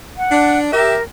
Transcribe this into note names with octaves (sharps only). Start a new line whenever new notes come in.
F#5
D4
G4 A#4 E5